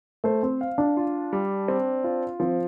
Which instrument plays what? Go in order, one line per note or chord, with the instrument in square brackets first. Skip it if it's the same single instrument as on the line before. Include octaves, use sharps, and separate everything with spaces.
[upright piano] A3 [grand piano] C5
[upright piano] C4
[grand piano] F5
[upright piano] D4
[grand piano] F4
G3
C4
F4
[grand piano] F3 [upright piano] C4